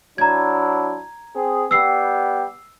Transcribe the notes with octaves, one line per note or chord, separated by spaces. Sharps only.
F#3 D4 E4 A#5 G#6
C4 G#4
G3 B3 G4 E6 C7